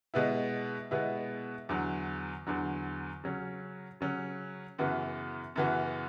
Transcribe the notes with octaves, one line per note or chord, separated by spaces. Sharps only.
B2 G#3 B3 E4
B2 G#3 B3 E4
E2 D3 F#3
E2 D3 F#3
C#3 F#3 C#4
C#3 F#3 C#4
F#2 C#3 E3 B3 F#4
F#2 C#3 E3 B3 F#4